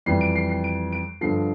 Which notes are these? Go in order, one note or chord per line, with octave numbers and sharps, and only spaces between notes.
F2 E3 G3 C7
D7
C7
C7
D7
D7
G2 D3 F3 C7